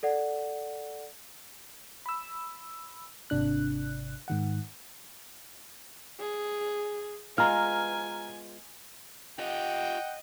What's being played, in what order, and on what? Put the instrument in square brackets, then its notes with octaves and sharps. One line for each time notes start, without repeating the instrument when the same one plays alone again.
[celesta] A4 D5 F#5
[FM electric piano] B5 E6
G#1 C3 D4 F#6
G#2 D#3 F#5
[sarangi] G#4
[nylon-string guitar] G#3 B3 F4 [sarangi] G#5 [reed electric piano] A#5 F6
[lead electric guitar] F4 G4 [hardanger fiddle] D#5 [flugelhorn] F#5 [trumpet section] G5